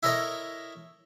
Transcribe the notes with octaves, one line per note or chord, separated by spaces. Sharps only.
E4 A4 A#4 C#5 D#5 E5